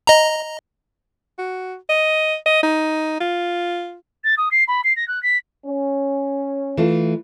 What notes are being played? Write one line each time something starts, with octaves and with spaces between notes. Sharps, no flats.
D#5 A#5
F#4
D#5
D#5
D#4
F4
A6
D#6
C7
B5
C7
A#6
F#6
B6
C#4
E3 A3 F4